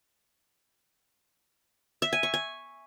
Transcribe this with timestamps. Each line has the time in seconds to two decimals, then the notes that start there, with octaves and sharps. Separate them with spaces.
2.02 E5
2.13 G#5
2.23 C#6
2.34 G#5